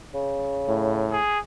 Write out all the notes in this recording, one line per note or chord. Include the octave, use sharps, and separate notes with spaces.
C#3
A2
G#4